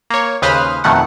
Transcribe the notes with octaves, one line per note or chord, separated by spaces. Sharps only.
A#3 C#5
D#2 C#3 B4 C5 D#6 F6
F2 B2 D#3 A3 F#5